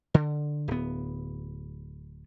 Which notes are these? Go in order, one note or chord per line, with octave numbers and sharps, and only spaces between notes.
D3
D1 B3